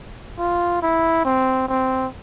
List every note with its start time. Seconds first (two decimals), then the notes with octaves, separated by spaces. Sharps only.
0.39 F4
0.82 E4
1.25 C4
1.68 C4